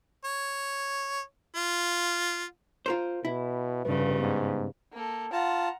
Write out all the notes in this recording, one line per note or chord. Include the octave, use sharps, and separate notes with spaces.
C#5
F4
F4 A#4 C5
B2 E4
F1 G2 C#3 B4
G#2 B3
A#3 A4
F4 F#5 A5 A#5